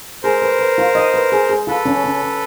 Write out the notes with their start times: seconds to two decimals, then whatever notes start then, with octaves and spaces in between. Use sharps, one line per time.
0.23 G#4 A#4 C5
0.42 B4
0.59 B4
0.78 F4
0.95 D#5
1.14 B4
1.32 G#4
1.49 G#4
1.67 F4 A4 B4
1.86 C#4
2.04 C#4
2.22 C#4